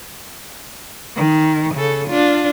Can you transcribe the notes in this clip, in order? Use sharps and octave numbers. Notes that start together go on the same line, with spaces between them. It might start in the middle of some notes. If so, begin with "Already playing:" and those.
D#3
C#3 A4
D4 F4